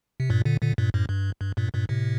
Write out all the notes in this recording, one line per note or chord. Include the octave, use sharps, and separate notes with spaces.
C3
G2 A#2
A#2 D3
A#2 D3
G2 A#2
F#2 A2
G2
G2
G2 A#2
G2 A#2
A2 C3